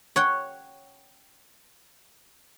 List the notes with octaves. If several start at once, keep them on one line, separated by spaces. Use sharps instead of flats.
C#5 F#5 G5